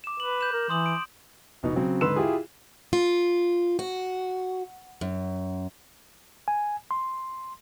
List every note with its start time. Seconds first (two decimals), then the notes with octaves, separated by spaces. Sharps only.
0.04 D6 E7
0.20 B4 F#7
0.41 G6 E7
0.53 A#4
0.70 E3 C6 D#6 F#7
0.86 D7
1.63 F1 B2 D#4
1.76 C#3 F#3 C4
2.01 G#2 D3 B4 C6 E6 E7
2.16 E4 F4 G4 G#4
2.93 F4
3.79 F#4
5.01 F#2
6.48 G#5
6.91 C6